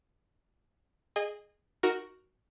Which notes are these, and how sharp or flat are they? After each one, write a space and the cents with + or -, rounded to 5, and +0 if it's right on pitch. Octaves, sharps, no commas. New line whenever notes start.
G#4 +5 D#5 -20 G#5 -35
D#4 +0 F#4 +0 A#4 +0